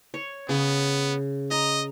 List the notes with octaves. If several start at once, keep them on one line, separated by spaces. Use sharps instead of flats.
C#5
C#3 B3
D#5 A#5